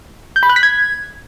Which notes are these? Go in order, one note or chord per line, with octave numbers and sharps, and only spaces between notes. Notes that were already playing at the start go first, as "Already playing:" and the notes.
G6
B5
F#6
B6
G#6